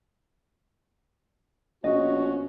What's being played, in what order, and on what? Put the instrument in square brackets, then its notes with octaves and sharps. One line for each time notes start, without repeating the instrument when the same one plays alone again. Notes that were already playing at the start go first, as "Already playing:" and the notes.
[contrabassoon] A#1 [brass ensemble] B2 F3 C#4 [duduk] F#4 [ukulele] D#5